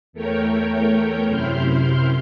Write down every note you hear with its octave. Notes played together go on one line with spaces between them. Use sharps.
E2 A3 A#4 C#5 G5 G6
F#2 C3 E4 C6 F6 G6